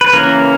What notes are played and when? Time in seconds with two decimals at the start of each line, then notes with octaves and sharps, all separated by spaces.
0.01 B4
0.13 C#3 E3 A#3 C#4 A#4